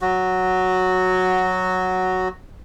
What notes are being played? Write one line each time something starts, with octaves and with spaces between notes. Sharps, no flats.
F#3 F#4